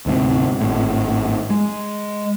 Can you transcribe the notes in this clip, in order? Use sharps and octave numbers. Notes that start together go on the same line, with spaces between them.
D2 G#2 C3
G#1 A2
G#3